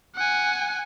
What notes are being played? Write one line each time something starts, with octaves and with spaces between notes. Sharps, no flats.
F#5 G#5